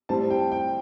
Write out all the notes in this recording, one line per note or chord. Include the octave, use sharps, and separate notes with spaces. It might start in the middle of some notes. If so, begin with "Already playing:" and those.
A2 G3 C4 A5
G5
G5